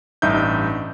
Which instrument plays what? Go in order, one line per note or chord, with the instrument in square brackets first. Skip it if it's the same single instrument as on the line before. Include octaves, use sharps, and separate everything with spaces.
[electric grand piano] A1 G2 D#4 E5 G6